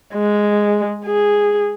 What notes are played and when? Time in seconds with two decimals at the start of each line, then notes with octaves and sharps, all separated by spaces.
0.15 G#3
1.06 G#4